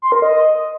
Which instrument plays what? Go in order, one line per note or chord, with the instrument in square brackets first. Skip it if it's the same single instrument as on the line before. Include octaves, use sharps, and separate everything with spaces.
[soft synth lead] C6
A#4
D#5